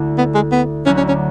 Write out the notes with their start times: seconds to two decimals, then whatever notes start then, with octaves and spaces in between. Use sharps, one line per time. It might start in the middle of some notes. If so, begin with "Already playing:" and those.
Already playing: D2 D3 A3 E4
0.18 B3
0.35 G#3
0.52 B3
0.86 D2 D3 F#3 C#4
0.97 C#4
1.08 C#4